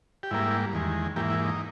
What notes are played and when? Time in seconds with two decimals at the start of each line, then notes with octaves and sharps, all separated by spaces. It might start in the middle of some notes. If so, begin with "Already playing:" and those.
0.23 G4
0.31 G#2 G3 A#3 E4
0.73 E2 D#3 G#3
1.16 G#2 E3 A#3 G4
1.30 E4
1.45 D#4